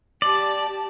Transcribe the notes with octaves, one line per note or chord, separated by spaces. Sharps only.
G4 D5 A5